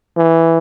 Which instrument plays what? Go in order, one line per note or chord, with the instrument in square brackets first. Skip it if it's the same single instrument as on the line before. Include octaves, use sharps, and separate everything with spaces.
[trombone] E3